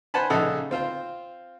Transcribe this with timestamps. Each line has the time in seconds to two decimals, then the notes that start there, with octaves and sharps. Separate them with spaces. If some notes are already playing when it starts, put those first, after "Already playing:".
0.14 C5 F#5 G#5 A5 B5
0.30 A#1 C#3 D#4 A4 E5 F#5
0.71 C4 F4 C5